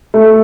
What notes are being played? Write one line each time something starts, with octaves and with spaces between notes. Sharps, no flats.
A3